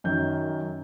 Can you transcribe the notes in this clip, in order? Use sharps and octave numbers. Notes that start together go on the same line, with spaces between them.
F#2 D#3 G6